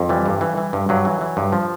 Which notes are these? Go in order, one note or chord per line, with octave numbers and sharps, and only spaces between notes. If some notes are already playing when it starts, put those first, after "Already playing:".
Already playing: F2
E3 G3
G2
E3
E3
G2
G2 F#3
E3
E3
G2
F3